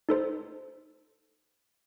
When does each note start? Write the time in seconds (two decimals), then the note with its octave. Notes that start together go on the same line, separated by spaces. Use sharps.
0.09 D#4 A4 C5